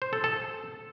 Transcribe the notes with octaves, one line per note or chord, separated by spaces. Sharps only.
C5
A4
A4